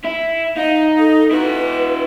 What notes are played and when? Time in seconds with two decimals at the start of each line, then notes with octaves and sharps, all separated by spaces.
0.04 E4
0.56 D#4 F5
0.99 A4
1.31 E4 F#4 B4